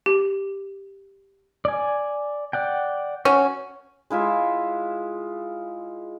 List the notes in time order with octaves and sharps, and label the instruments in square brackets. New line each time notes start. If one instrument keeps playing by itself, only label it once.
[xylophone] G4
[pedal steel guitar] D5 G#5
D5 F#5 G5
[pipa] C#4 F#4 [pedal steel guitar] C#5
[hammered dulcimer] G#3 E4 F4 E5